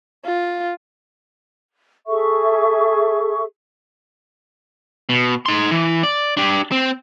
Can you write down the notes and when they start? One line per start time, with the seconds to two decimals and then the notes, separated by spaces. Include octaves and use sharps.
0.25 F4
2.07 G#4 A4 E5 C#6
5.09 B2
5.46 D#4 C6
5.71 E3
6.03 D5
6.37 D4 G4
6.72 C4